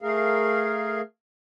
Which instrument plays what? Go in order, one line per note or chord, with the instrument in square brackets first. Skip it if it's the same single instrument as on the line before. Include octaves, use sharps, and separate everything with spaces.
[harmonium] A3 G#4 A#4 F5